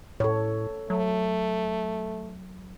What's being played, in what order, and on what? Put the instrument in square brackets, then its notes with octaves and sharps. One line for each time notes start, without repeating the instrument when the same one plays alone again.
[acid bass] A2 [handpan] A4 C#5
[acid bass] F#3 [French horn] A3